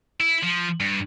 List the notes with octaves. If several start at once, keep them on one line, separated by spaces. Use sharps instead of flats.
E4
F3
G2